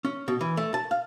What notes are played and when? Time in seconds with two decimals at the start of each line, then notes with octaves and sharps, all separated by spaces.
0.05 C#4
0.28 B2
0.41 E3
0.57 A3
0.74 A5
0.91 F5